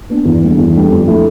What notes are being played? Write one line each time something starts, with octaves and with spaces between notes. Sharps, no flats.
B3 D4
E2
D3 G3 B3
E2
D3 G3 B3
F2
D3 F3 A3 E4